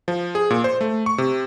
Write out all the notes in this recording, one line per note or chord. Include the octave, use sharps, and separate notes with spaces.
F3
G#4
A#2
C5
A3
C#6
C3